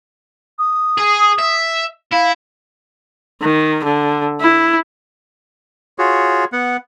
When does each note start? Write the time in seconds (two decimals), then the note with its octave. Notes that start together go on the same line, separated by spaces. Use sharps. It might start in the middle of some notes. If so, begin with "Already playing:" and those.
0.58 D#6
0.98 G#4
1.39 E5
2.11 E4 F5
3.42 D#3
3.85 D3
4.41 E4
5.99 F4 F#4 G#4 C#5
6.53 B3 F#5